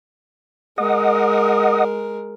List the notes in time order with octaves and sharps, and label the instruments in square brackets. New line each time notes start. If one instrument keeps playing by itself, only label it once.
[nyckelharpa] G#3 A#4 [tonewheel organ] D#5 F#5 D#6